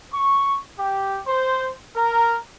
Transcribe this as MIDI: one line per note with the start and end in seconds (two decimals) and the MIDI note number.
0.13 0.56 85
0.78 1.17 67
1.27 1.71 72
1.95 2.36 70